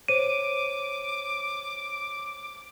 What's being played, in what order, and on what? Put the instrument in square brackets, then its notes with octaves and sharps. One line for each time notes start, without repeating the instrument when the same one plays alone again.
[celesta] C5 C#5 [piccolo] D6 [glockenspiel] D#7